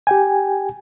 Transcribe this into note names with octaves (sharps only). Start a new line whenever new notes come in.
G4 G5 G#5